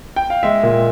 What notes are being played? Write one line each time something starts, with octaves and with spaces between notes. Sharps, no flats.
G5
F5
G#3 E5
A#2